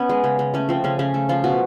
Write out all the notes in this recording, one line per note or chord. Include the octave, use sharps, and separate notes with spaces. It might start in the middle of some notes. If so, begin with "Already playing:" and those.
Already playing: B3 C#4
G#3
C#3
C#3
A3 C#4
F3 C4
C#3 C#4
C#3 C#4
A3
F3 F4
B2 F#4